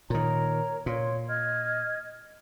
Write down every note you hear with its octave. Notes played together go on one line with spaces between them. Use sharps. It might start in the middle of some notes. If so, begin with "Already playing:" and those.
A#2 D#3 A#4 C#5 A#5
A#2 C#5 C6
D#5 F6 G#6